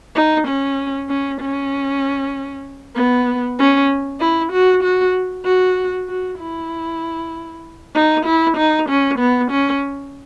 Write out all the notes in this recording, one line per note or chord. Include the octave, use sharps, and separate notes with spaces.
D#4
C#4
C#4
C#4
B3
C#4
E4
F#4
F#4
F#4
F#4
E4
D#4
E4
D#4
C#4
B3
C#4